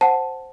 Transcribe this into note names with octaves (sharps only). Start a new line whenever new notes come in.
C5 F#5 A5